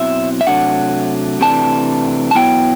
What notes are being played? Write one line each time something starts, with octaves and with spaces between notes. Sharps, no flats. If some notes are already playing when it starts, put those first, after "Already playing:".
Already playing: B2 F#3 C4 E4 E5
E5
C3 F#3 A3 D4 F#5
C3 E3 A3 D4 A5
A5
B2 F#3 B3 E4 G5